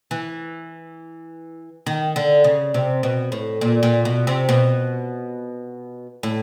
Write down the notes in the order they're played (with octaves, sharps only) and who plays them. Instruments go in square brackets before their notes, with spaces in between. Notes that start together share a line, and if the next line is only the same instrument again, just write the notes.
[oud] E3
D#3
D3
C#3
C3
B2
A2
A#2
A#2
B2
C3
B2
A2